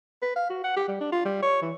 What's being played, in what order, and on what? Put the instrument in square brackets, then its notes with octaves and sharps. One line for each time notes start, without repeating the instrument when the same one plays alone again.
[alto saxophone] B4
F5
F#4
F#5
G4
G3
D4
F4
G3
C#5
E3